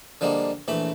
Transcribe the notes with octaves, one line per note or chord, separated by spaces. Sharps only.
D3 F3 G3 G#3 A#3
A#1 E3 A3 B5